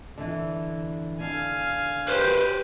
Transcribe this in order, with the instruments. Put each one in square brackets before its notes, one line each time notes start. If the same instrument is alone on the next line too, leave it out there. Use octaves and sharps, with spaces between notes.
[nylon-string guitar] D3 E3
[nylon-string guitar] D3 [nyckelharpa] F5 G#5
[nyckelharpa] G4 [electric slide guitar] B4 C5